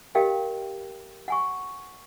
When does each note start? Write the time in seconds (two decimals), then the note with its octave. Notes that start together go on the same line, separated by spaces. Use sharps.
0.15 G4 A#4 D#5 F5 G5
1.28 F#5 G#5 C#6